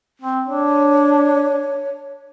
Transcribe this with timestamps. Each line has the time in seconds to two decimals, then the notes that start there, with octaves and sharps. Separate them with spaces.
0.22 C4
0.46 D4 C#5